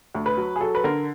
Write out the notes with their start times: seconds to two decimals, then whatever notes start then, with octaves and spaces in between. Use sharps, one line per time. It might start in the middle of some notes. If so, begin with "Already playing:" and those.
0.15 D2
0.26 B4
0.37 F#3
0.56 G#4
0.61 F#3 A4
0.75 B4
0.84 D3 A#4